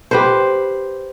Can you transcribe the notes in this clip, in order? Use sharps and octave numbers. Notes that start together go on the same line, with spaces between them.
G4 B4 C5